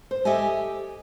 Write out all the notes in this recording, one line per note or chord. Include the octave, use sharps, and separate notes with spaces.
C5
G4 A4 D#5 E5 G#5